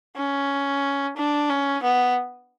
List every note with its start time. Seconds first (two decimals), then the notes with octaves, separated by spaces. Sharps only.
0.17 C#4
1.17 D4
1.50 C#4
1.83 B3